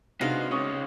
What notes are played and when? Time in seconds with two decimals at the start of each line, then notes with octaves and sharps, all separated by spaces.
0.21 C3 G#3 D4 D#4 F#4 B4 F5 A#6
0.51 C#2 C#4 C#6 D#6